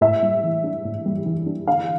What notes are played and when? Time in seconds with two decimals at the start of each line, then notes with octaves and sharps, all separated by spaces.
0.01 A2 E5
0.22 G3
0.44 E3
0.64 D4
0.85 A2
1.06 G3
1.26 E3
1.46 D4
1.67 D3 F5